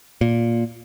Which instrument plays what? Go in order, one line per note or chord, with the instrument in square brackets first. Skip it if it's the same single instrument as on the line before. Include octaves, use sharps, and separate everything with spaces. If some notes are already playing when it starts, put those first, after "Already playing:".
[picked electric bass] A#2